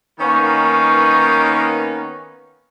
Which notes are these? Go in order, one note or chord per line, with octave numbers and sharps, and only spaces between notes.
D#3 A#3 B3 C#4 D#4 B4